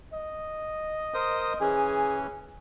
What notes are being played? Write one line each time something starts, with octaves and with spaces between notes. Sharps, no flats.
D#5
A#4 C5 D#6
E3 C#4 G#4